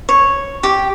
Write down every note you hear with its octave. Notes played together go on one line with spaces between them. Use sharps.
C#5
G4